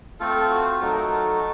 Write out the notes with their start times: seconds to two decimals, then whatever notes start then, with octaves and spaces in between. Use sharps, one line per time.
0.20 A3 C4 F4 A4
0.50 F#4
0.80 F#3 A3 D#4 F#4 A4
0.92 A#4
1.02 A4